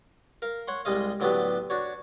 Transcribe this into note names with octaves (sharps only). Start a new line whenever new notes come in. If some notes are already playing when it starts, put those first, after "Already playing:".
A#4 F5
C#5 F#5 C6
C2 G3 G#3 D#5 F5
A2 D3 F#3 B3 D4 G4
D4 F#4 C#5